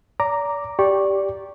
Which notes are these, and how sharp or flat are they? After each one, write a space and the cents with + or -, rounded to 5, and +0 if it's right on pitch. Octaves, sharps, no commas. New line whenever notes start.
D5 -40 A#5 +0 D6 +0
G4 +0 D5 -15 C#6 -20